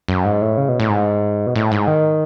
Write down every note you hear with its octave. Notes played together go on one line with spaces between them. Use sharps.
F#2
G#2
A2
C#3
B2
A2
G#2
B2
A2
G#2
D#3